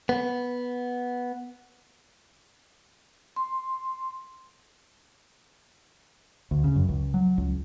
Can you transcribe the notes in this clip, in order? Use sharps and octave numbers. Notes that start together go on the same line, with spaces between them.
B3
C6
D2
C#3
F#2
C#2
F#3
C#2